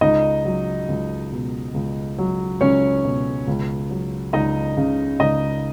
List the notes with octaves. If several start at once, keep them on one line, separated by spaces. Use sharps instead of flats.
C#2 D#4 D#5
F#3
C#2
B2
C#2
F#3
C#2 C#4 C#5
B2
C#2
F#3
C#2 D#4 D#5
C#3
C#2 D#4 D#5